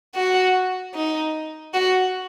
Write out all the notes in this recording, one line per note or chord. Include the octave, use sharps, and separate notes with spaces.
F#4
D#4
F#4